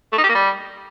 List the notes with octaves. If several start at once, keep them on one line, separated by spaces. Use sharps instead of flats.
A3
D#4
G4
A#3
G3